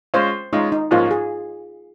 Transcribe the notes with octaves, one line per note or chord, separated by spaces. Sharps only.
G#3 C#4 F4 C5
G#3 C#4 D#4 F4
D#4
G#2 F3 A#3 C#4 F4
G#4